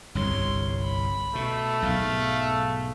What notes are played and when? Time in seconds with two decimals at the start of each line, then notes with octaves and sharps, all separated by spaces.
0.15 G1 C2 C3 C#5 C6
0.83 B5
1.35 B2 A3
1.82 B1 G#2 F5